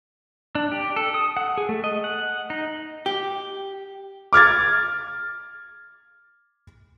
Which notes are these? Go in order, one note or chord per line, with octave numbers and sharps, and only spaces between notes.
D4
G4
A4
D#6
F#5
G#4
A3
D#5
F#5
D#4
G4
D6 F6 G#6 A6